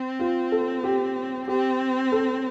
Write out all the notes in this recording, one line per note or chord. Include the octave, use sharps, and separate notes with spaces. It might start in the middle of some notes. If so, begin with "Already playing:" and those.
Already playing: C4
F4
A4
G4
C4 G4
A4